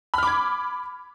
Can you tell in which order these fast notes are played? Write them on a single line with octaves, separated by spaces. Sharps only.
B5 F6 D6 G#6